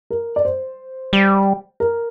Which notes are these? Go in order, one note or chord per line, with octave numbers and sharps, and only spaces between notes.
A#4
D5
C5
G3
A#4